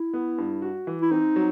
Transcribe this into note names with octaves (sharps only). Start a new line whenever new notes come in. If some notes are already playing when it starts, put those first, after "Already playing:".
Already playing: E4
B3
G2
F#4
E3
E4
C4 D#4
F#3